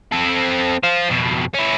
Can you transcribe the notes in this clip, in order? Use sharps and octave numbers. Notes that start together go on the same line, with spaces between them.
C4 A4
C5 F5
F2 B2
C#4 E4